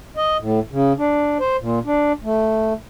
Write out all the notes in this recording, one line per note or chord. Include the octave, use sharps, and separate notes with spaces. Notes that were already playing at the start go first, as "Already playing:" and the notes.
D#5
A2
C#3
D4
C5
A#2
D4
A3